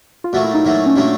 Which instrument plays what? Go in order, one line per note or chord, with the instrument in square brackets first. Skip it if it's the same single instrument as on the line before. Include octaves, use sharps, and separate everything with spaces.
[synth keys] F4
[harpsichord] A#2 F#3 A3 [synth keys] F#4
[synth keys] E4
D#4
[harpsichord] A#2 F#3 A3
[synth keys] C#4
[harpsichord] A#2 F#3 A3 [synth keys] D4